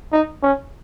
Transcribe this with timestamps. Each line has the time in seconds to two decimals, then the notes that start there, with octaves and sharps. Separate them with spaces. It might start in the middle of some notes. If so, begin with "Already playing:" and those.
0.13 D#4
0.43 C#4